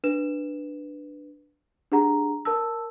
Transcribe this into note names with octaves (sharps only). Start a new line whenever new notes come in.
D4 B4 E7
D4 G4 G#4 F#5 A#5
A#4 A5 E6